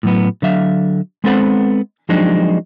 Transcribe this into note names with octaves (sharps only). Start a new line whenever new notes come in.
A2 F#3 B3
D3 F#3 E5 F5
G#3 B3 C4 A4 C5 F#5
F3 F#3 G#3 C4 D4 D#4